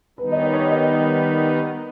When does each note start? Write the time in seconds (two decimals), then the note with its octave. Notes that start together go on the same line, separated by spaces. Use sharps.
0.18 D#3 G3 B3 D#4 B4
0.32 D#5
0.36 C#5
0.53 C#5
0.71 D#5